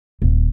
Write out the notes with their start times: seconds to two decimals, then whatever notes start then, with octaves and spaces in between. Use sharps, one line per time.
0.22 D#1